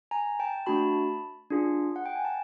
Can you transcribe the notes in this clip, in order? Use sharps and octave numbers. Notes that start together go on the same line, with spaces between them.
G#5 A#5
G5 A5
A3 D4 F#4 A5 B5
D4 F4 G#4
F#5
G5
G#5
A5